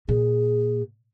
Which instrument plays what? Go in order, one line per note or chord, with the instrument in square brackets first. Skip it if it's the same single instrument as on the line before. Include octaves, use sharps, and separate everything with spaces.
[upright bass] A#2 [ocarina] G#4